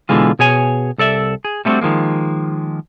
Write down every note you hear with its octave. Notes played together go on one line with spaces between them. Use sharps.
B2 D3 E3 G#3 F4
B2 G#4 C#5 G#5
C2 A4 D5 E5
G#4
G3 A3 B3 C4 D4 F#4
D#3 F3 G#3 A#3